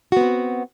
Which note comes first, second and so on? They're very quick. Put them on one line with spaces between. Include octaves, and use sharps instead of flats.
F#4 B3 C4